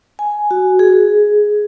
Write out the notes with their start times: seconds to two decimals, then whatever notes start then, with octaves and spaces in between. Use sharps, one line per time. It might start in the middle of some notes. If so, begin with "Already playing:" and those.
0.19 G#5
0.51 F#4
0.79 G#4